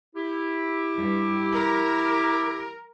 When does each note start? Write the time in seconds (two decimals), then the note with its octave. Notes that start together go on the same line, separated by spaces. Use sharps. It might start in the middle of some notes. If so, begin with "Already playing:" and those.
0.16 E4 G4
0.97 G2
1.54 A#4